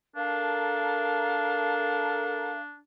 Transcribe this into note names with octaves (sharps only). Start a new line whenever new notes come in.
D4 A4 A#4 F5